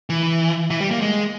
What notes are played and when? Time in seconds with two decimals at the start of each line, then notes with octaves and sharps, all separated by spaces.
0.10 E3
0.71 E3
0.81 G3
0.91 A#3
1.01 G#3